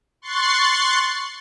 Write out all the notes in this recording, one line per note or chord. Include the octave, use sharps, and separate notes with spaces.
C6 C#6 F#6 A6 C7